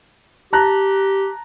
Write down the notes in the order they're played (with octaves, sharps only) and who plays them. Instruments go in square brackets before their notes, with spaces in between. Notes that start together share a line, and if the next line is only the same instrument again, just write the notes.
[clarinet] G4 [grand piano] A5 A#5 F#6